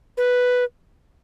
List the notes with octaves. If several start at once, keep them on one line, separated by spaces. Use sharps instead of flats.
B4